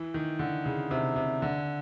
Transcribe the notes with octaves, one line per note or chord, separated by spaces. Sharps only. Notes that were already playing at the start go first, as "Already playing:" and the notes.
Already playing: E3
D#3
D3
C#3
C3
C3
D3